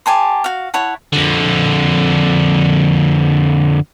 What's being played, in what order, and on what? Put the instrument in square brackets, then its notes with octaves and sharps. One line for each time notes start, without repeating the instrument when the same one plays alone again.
[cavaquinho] G4 G#5 A5 C6
F#4 F5
E4 C#5 F#5 A5
[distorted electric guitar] F2 D3